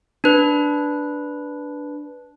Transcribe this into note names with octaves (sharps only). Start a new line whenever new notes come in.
D4 B4